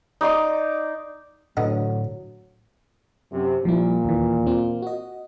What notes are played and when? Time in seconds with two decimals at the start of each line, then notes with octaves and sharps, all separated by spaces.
0.21 D#4 D5 C6 D6
1.57 D2 A2 D3 F#3 B3 D#4
3.32 F#2 C3
3.65 A#2 F3 G3 A#3 E4
4.05 D#2 E3
4.47 C4 F4
4.82 F#4 D#5